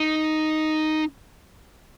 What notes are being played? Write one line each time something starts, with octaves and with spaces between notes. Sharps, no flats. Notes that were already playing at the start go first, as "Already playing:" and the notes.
Already playing: D#4